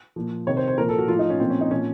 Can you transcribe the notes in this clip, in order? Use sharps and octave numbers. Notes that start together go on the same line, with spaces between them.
A#2 F3
C3 D#3 C#5
C5
C5
A#2 F3 A#4
A4
F#4
A2 F3 F4
D#4
C#4
A#2 F3 C4
C#4
D#4
A#2 F3 C#4